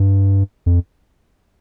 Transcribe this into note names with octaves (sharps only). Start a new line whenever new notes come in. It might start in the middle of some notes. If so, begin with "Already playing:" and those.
Already playing: G2
F2